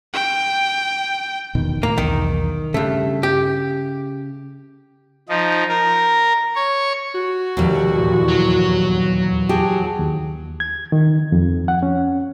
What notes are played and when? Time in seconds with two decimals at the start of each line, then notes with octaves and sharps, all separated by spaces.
0.13 G5
1.55 E1 B2 D#3
1.83 D2 A2 A#3
1.98 B1 E2 D#3
2.74 G2 C#3 A3
3.23 G4
5.29 F3 D#4
5.69 A#4
6.56 C#5 C#6
7.15 F#4
7.57 F1 D#2 B2 G3
7.96 E2 G2 A#2
8.28 F#3
9.49 G4 G#4 A5
9.99 D#2
10.60 G#6
10.92 D#3
11.32 F2
11.68 F#5
11.83 C#4